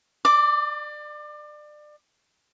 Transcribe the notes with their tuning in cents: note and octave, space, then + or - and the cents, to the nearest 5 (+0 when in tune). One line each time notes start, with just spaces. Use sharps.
D5 +30 D6 +0